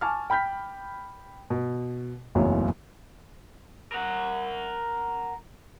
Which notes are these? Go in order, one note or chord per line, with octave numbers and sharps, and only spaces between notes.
G#5 A5 C#6 D6 F6
G5 B5 F6 G6 B6
B2
F#1 B1 E2 A2 C#3 F#3
A#4 F#5